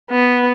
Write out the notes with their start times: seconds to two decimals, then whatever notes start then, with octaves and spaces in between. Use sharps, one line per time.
0.11 B3